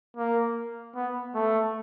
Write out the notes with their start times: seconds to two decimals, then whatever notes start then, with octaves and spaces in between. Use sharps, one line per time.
0.17 A#3
0.95 B3
1.34 A3